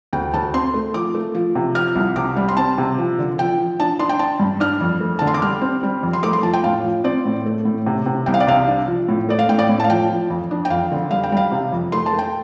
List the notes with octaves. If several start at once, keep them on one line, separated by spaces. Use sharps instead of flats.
D2 G5
D2 A5
C4 C6
A3
F3 D6
A3
F3
C3
F3 F6
C2
C3 D6
G3
C6
C4 A5
C3
F3
D3
F3 G5
F3
D4 A5
D4 C6
G5
D4 A5
G2
D4 F6
F2
A3
A5
D3
C6
D6
G3 F6
C4
G3
F2
C6
A3 D6
C6
F3 A5
G5
A2 F5
F3
C4 D5
A2
A3
A2
C3
C3
C2 G5
F5
D5
C3 F5
D4
F3
A2
A3 D5
F5
A2 G5
D5
A2
A5
F5
F3 G5
F3
F2
D4
G5
F2 F5
D3
G3 F5
G5
G3 F5
C3
F2
A3 C6
A5
A3
G5